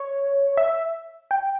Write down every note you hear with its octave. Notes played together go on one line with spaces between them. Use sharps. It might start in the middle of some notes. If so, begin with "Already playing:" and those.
Already playing: C#5
E5
G5